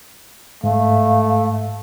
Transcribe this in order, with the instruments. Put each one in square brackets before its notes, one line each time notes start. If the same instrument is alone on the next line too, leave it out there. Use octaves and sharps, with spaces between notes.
[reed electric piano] G#2 [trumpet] A3 [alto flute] F5